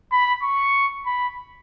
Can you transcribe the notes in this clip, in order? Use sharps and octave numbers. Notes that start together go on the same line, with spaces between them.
B5
C#6
B5